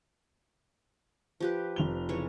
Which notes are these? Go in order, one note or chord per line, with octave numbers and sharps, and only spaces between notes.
F3 G4 B4
F1 F7 G7
C#3 E3 C#5